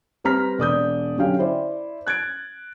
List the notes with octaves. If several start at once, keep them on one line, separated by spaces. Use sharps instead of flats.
G3 C4 B4 A#5 F6 B6
E1 D5 D#6 G6
D3 F#3 C#4 G4 F5 G5
E4 C5 D5
F#6 G#6 A6 D7